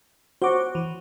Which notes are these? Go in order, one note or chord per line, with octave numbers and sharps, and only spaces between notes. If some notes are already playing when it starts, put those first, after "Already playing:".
F#4 C5 D6
E3